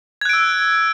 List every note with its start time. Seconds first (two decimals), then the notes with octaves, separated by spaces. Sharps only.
0.21 G#6
0.25 F#6
0.29 D7
0.33 E6